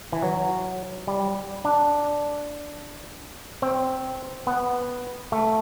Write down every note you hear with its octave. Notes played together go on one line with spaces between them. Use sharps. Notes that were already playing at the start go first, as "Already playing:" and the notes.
E3
F#3
G3
D4
C4
B3
A3